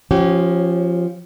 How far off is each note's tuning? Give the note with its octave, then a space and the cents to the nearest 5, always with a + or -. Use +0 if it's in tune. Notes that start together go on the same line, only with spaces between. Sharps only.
F3 +0 C#4 -20 G4 -35